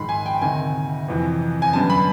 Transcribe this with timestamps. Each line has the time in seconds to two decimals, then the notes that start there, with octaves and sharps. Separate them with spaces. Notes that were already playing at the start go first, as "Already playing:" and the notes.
Already playing: A#1 G#2 D#3 B5 C6
0.09 G#5
0.26 G5
0.42 D2 C3 D#3 G#5
1.08 F2 C3 E3
1.62 G#5
1.73 F#2 D3 G3 B3 A5
1.90 B5